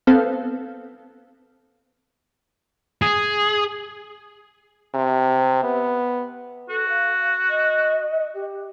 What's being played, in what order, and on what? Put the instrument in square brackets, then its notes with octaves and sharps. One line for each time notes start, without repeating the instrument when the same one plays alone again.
[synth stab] B3 C4 A4 F5
[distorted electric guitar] G#4
[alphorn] C3
B3
[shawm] F#4 [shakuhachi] A4
[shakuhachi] F5
D#5
G4